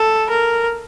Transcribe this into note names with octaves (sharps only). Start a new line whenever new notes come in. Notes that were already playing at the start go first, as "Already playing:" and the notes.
Already playing: A4
A#4